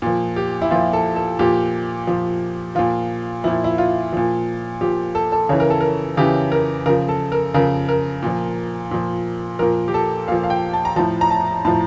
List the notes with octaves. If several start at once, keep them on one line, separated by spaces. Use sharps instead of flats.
A#2 F3
G4
E4
A#2 F3 F4
A4
A4
A#2 F3 G4
A#2 F3
A#2 F3 F4
A#2 F3 E4
E4
F4
A#2 F3
A#2 F3 G4
A4
A4
C#3 E3 C#5
A#4
A4
A#4
C#3 E3 G4
A#4
C#3 F3 A#4
A4
A#4
C#3 F3 A#4
A#4
A#2 F3
A#2 F3
A#2 F3 A#4
G4
A4
A#2 F3 F5
F5
G5
A5
A#5
A2 F3 A5
A#5
A5
A2 F3 A5